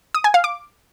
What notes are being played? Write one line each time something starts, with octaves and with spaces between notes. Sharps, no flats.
D#6
G#5
F5
D6